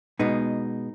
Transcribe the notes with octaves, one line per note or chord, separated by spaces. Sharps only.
B2 G#3 B3 D#4